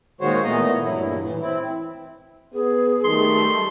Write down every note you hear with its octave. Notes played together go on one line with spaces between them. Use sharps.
A#2 D#3 G#3 F#4 C5 C#5
A#2 E3 A3 B3 D#5 A#5
G2 F#3 E4
G2 A#2
A2 E3
C4 E4
B3 G#4
D#3 G3 A3 C6